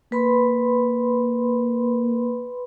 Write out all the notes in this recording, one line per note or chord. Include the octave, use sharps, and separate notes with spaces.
A#3 B4 B5 C6